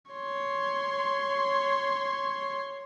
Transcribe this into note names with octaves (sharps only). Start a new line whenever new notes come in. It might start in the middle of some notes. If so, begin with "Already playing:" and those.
C#5 C6